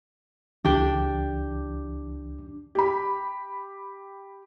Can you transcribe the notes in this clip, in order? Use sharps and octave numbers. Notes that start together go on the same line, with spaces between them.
C#2 E3 D4 G4
G4 B5